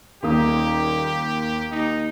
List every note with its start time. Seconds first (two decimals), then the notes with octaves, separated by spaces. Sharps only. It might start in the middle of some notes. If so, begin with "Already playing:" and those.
0.23 D#1 D#2 A#3 G4 D#6
1.71 D#2 D#4